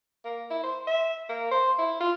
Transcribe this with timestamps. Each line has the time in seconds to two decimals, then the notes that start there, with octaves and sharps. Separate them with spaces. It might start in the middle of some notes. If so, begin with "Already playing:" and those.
0.25 A#3
0.50 E4
0.63 C5
0.87 E5
1.29 A#3
1.51 C5
1.78 E4
2.00 F4